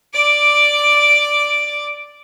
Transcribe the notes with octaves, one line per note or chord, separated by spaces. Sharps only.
D5 D6